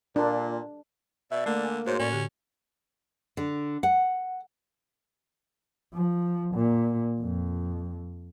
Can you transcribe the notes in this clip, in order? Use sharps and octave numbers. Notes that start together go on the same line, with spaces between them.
A#2 D4
B2 D5 E5
D3 A3 A#3
G#5
G#2 F#4 C5 C#5 C6
A2 C#4 D5
D3 G4
D3
F#5
F3
A#2
F2